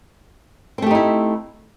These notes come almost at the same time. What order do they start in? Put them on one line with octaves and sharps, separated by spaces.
C4 A3 G4 D#4 E4